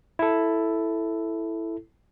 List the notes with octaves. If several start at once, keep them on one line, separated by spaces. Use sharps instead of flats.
E4 A4